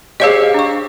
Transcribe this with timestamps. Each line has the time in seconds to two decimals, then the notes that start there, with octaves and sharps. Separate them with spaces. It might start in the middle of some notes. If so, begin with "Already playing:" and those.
0.20 G4 G#4 C5 C#5 D#5 F5
0.54 D4 C#6